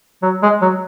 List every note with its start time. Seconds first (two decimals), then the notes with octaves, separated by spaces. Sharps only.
0.23 F#3
0.42 G#3
0.62 F#3